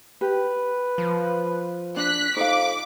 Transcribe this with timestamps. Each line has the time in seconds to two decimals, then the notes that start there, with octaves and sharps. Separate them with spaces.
0.21 G4 B4
0.98 F3
1.97 D4 F#6 B6
2.36 F2 D#4 F5 D6